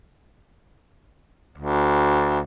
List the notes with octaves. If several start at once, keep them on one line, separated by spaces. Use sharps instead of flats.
D2